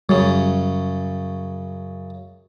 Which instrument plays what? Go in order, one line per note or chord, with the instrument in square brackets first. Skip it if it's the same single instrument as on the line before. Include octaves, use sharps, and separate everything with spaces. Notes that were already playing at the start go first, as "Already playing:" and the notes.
[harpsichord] F#2 C#3 [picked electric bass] G3